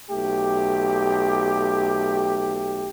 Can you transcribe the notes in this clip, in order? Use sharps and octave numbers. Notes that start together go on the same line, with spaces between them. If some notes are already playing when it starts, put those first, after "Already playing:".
B1 A3 G4